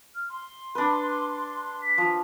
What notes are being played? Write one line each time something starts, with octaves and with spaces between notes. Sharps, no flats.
F6
C6
D4 B4
B6
F3